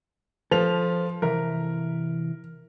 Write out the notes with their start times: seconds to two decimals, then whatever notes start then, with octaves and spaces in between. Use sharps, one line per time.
0.51 F3 A4 F7
1.22 C3 E3 A#4 E5